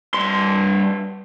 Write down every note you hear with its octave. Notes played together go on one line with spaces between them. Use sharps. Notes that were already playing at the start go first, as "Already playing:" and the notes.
G2 C6